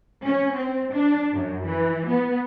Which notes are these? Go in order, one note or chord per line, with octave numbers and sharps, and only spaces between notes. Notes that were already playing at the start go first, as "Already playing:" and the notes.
C#4
C4
D4
F#2
E3
B3